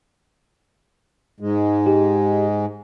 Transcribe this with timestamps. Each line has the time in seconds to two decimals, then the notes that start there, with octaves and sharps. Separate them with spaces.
1.40 G#2 G#3
1.86 G4